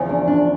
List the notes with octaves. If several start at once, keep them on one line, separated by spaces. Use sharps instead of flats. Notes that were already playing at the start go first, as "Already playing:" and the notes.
Already playing: E2 C#3 F3
D4
D4